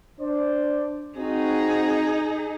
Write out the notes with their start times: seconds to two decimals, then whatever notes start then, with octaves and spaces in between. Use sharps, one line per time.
0.20 D4 C5 D5
1.17 C4 D#4 F#4 G#4